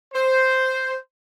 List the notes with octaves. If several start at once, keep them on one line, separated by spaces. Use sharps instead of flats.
C5